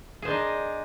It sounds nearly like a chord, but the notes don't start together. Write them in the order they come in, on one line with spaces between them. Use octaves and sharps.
G#4 C5 D4 D#4